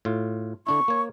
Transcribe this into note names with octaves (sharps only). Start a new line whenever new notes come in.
A2 F4
D3 D4 E4 C#6
A#3 C#5